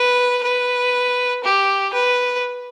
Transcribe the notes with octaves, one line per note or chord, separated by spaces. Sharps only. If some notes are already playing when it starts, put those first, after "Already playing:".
Already playing: B4
B4
G4
B4